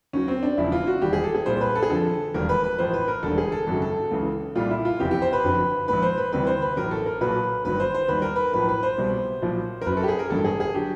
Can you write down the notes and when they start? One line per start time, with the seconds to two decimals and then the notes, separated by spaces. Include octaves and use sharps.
0.13 D#2 D#3 F#3 C#4
0.28 C4
0.43 D4
0.57 E1 E2 C#3 F3 E4
0.72 F4
0.87 F#4
1.02 E1 D#2 D#3 G3 G4
1.13 G#4
1.24 A4
1.35 G#4
1.46 C2 A#2 G3 C5
1.61 B4
1.75 A4
1.83 G#4
1.90 F2 D3 F3 A4
2.34 E1 D#2 D#3 G3 A#4
2.49 B4
2.64 B4
2.79 A1 A2 F3 C5
2.93 B4
3.08 A#4
3.23 E1 D#2 D3 G3 A4
3.38 G#4
3.52 A4
3.67 G#1 F#2 C#3 F#3 A4
3.82 A4
3.96 A4
4.11 C#2 C#3 E3
4.55 C2 A#2 G3 F4
4.70 E4
4.85 F4
4.99 F1 E2 C3 E3 G4
5.11 G4
5.22 C5
5.33 B4
5.44 F#1 F2 D3 F#3
5.88 A#1 G#2 D#3 B4
6.03 C5
6.18 B4
6.32 D2 C3 E3 G3 B4
6.47 C5
6.62 B4
6.77 A1 A2 F#3 A#4
6.91 A4
7.06 A#4
7.21 B1 A#2 F#3 B4
7.65 G1 G2 D#3 F#3 B4
7.80 C5
7.95 C5
8.08 D#2 D#3 G3 B4
8.22 A#4
8.36 B4
8.53 B1 A2 F3 B4
8.69 B4
8.83 C5
8.98 C2 B2 G3
9.42 B1 A#2 F3
9.82 A#4
9.86 F#1 F#2 C#3 F#3 B4
9.97 A4
10.03 G4
10.08 G#4
10.19 A#4
10.30 A1 G2 D3 F#3 A4
10.45 G#4
10.60 G#4
10.74 D3 F#3 G4